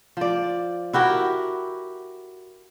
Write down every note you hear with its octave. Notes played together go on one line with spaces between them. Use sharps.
F3 D5
E4 F#4 G4 A#4